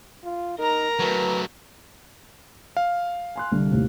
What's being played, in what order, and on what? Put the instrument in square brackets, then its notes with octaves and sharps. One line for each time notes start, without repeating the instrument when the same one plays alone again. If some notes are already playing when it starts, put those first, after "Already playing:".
[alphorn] F4
[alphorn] D#4 [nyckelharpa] A#4 A#5
[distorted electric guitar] F#3 A3 [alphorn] B4
[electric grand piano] F5
[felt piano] G#5 C6 F#6
C2 D3
D#2 A2 C3